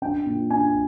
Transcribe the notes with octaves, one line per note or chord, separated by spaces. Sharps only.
D4 G5
A#2
D4 G#5